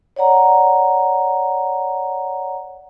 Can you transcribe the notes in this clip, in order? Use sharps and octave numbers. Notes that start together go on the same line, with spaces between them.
C#5 D5 F#5 A#5